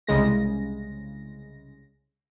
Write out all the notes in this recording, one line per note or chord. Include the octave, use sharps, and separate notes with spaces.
C2 C#3 G#3 A#6